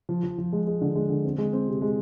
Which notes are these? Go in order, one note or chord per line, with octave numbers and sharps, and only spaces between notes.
F3
F3
F3
G#3
G#3
D3
G#3
D3
C4
G#3
C4
C3
G#3